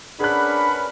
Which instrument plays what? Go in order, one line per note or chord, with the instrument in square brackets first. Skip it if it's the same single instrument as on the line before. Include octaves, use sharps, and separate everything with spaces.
[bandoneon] C#4 A#4 B4 [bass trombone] D4 [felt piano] G#4 F#6 [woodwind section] F#5 B5